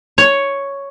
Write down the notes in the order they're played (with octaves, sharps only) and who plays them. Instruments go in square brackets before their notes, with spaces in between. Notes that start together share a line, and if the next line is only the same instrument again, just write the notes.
[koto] C#5